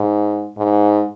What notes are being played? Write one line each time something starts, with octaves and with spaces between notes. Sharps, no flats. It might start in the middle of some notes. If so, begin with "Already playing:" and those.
Already playing: G#2
G#2